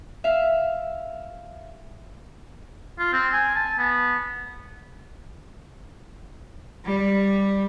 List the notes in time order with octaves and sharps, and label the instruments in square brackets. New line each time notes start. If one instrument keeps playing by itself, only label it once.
[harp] E5 F5
[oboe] F4
C4
G#5
A5
B3
[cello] G3